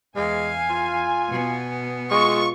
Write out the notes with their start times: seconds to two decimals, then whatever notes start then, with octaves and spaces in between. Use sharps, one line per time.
0.16 E2 G#3 F5 G#5
0.70 F4
1.29 B2 B3
2.11 G#3 F4 C#6